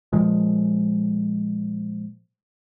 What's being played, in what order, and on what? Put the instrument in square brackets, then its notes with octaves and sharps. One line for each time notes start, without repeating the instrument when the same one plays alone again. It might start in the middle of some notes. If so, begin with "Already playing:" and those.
[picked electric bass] A#2 F3 G#3